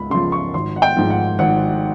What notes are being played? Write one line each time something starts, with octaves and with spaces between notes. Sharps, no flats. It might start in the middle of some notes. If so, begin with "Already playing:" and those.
Already playing: C#2 B5
C#3 F3 C6
C#6
G#1 C6
F#5
G5
G#2 F3
F#5
G#1 F#5